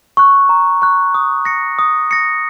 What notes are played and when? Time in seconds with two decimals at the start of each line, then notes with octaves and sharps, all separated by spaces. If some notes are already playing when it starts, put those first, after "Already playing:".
0.17 C#6 F#6
0.49 A#5
0.82 C#6 F#6
1.14 D#6
1.45 A#6 C#7
1.79 D#6
2.11 A#6 C#7